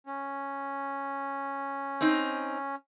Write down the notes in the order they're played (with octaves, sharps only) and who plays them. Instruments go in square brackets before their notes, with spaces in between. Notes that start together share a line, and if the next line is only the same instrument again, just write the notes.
[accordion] C#4
[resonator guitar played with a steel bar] C4 D#4